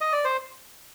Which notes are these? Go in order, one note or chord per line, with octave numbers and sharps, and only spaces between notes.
D#5
D5
C5